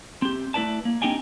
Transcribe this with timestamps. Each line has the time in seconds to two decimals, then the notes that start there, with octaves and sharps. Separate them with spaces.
0.22 C4 G4
0.54 A3 E4 B4 D5 A5
0.85 A#3
1.02 C4 D4 D#4 G4 G5 G#5